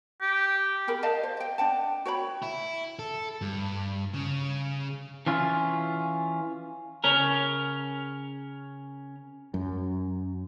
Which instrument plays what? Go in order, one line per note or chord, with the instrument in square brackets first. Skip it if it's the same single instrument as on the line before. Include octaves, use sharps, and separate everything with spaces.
[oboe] G4
[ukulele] G4 G#4 A#4 B5
D5 D#5 F5 A5
C5
D#5 G5
D4 F#5 G5 A5
F#4 C#5 G5 B5
[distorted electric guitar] E4
A4
G2
C#3
[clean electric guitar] E3 C#4 F4
C#3 C#4 A#4
[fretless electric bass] F#2